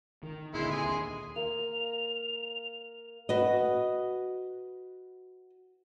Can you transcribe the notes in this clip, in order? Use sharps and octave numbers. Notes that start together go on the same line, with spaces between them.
D#3
A#2 D3 G#3 E4 C6
G#4 G#5 C6
D#2
A#3 F7
F#4 B4 D#5